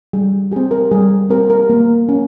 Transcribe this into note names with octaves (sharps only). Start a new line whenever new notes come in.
G3 G#4
C4 G4 G#4
A#4
G3 G#4
C4 G4 A#4
A#4
A#3
C#4